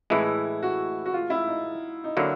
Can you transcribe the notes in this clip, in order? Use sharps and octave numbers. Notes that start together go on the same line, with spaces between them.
A2 E3 G#3 E4
F#4
F#4
F4
E4
D#4
D#4
D3 F#3 A#3 E4